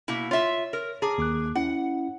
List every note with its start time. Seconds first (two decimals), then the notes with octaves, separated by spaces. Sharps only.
0.08 B2 A#3 E4
0.31 F4 C#5 E5
0.73 A#4
1.02 G#4 A5 A#5 D6
1.18 D#2 D6 F#6
1.55 C#4 E4 F#5